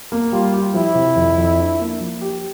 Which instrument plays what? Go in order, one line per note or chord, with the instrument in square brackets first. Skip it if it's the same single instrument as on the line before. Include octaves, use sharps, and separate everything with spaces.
[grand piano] A#3
[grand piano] G3 [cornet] F4
[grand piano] G4
[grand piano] F3 [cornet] E4
[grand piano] C3
F2
F2
D4
A#3
F3
G4